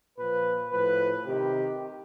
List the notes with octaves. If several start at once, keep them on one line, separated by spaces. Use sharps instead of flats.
A#2 F3 B4
A2 F3 B4
C3 D#3 G4